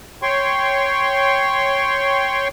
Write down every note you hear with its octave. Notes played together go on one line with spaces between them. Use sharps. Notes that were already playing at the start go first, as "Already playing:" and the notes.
C#5 G5 C6 C#6